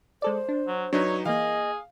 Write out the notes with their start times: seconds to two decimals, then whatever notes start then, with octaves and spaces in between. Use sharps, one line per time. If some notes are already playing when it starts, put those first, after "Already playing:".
0.22 G#3 A4 C5 D5
0.48 D4
0.68 F#3
0.93 F#3 D4 D#4 B4 C#5
1.26 E3 A#3 G#4 D#5 F5